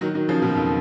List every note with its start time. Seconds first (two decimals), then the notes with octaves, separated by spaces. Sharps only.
0.01 D#3 F#3
0.14 D#3 F#3
0.28 C#3 F3
0.42 B2 D#3
0.55 F2